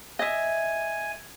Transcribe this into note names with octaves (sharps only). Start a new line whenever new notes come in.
D#5 E5 G#5